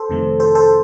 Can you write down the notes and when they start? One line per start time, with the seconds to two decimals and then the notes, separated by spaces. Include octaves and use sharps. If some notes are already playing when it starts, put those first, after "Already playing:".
Already playing: A4 C5
0.10 F2 C3 D#3 A3
0.40 A4 C5
0.55 A4 C5